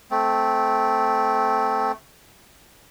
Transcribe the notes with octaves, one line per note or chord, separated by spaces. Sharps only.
A3 C4